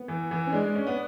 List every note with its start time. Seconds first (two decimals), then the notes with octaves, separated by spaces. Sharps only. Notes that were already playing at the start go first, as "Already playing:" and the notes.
Already playing: B3
0.08 E3
0.31 E3
0.47 C#4
0.53 G#3 D4
0.64 G#3
0.75 C#4
0.87 B3